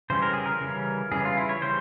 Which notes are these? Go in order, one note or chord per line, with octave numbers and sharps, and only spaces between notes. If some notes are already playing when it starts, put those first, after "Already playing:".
C#3 E3 G3 C#4 C5
A#4
G#4
A#4
C#3 E3 G3 C#4
C#3 E3 G3 C#4 G#4
F4
E4
C#5
C#3 E3 G3 C#4 C5